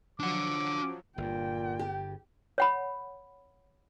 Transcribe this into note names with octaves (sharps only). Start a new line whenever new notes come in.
F3 F#3 D4 F#5 D6
G1 G2 A#2 G5
G4
C#5 F#5 B5